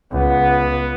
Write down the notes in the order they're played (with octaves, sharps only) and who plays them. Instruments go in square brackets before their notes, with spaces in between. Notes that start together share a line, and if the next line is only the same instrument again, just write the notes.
[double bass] C#2 [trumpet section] B3